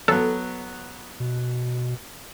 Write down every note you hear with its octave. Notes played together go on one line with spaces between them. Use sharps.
F#3 B3 A4
B2